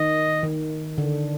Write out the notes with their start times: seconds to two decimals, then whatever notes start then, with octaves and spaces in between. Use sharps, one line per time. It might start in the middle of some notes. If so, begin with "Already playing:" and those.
Already playing: D#3 D#5
0.43 D#3
0.98 D3